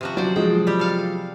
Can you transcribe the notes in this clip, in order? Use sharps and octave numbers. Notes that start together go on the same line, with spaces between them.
C3 F3 F#4
F#3 C5 D5
F3 F#3 G#3 G5
G3 G4
A4 F5